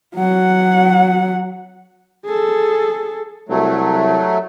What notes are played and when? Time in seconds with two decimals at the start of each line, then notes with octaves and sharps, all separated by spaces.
0.16 F#3 F#5
2.25 G#4 A4
3.49 C2 F#3 A3